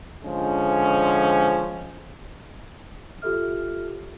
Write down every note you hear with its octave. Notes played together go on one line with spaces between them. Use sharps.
D3 F3 G#3 C#4
F4 G4 A4 E5 F6